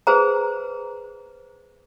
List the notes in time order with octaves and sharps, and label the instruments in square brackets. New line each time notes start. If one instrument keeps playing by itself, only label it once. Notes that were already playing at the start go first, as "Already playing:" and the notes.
[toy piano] G#4 B4 C5 A#5